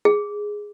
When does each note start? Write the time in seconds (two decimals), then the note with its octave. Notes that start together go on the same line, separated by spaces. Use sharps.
0.05 G#4